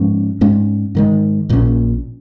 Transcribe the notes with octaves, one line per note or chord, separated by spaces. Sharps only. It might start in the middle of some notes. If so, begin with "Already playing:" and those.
Already playing: G#2 F3 G#3 C#4
G#2 G#3 C#4
G#2 D#3 G#3
A#1 A#2 F3 C#4